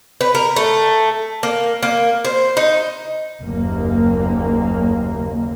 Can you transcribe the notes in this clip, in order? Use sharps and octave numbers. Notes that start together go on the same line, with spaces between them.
B4
A#4
A3
A#3
A#3
C5
D#4
F#1 D#2 A#3